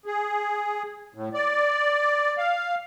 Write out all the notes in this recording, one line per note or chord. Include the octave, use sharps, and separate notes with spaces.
G#4
A2
D5
F5